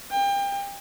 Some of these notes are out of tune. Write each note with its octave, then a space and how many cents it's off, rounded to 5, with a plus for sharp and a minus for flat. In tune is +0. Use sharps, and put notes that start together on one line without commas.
G5 +30